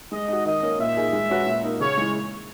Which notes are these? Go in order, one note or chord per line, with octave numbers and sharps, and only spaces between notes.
G#3 D#5
D#4 F#4
D#3 D#5
A#3 C#4
A#2 E5
A#3 D#4 G#4
G#3
C#4 F#4 B4
A#2
A#3 D#4
C#3 C#5
E3 G#3